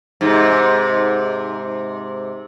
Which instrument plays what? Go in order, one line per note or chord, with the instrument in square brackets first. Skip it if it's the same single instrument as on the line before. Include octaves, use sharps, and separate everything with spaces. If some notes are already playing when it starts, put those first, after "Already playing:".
[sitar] G#2 C3